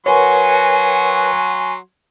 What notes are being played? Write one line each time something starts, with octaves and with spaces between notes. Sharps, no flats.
F#3 F#4 A#4 B4 C#5 G#5 C6